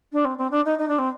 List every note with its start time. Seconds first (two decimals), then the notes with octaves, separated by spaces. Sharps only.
0.12 D4
0.25 C4
0.38 C4
0.51 D4
0.65 D#4
0.78 D#4
0.88 D4
0.98 C4